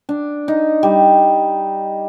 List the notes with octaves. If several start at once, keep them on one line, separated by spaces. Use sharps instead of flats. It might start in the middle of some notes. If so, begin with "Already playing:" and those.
D4
D#4
G3